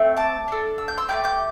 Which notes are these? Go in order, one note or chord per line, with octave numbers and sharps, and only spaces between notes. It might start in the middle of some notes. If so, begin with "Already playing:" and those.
Already playing: A3 C4
A5 D6
D4 A4
E6
G6
C6 E6
A3 E4 G4 D6 G6
D6 G6